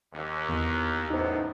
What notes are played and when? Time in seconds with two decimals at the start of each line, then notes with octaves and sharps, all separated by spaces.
0.13 D#2
0.49 E2
1.10 F#2 A2 B3 D#4 C5